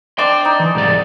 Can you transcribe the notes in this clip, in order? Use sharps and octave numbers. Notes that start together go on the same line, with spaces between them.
D4 G5 A5 C6 D6
D#4
E3
C2 G#2 D5